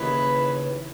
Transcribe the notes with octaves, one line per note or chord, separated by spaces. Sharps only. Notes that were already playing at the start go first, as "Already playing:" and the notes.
Already playing: D#2 C#3 E3 B4